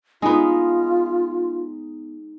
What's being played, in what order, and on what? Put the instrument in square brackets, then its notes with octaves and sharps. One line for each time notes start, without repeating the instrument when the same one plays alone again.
[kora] G#3 B3 [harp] D#4 [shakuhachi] F4